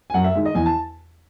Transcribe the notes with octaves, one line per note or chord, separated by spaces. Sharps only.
G#5
F#2 F#5
E5
D#3 G#3
D#5
E2 G#5
A5